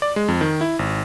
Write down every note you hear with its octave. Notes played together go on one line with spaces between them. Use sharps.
D5
G#3
F2
D#3
E4
G#1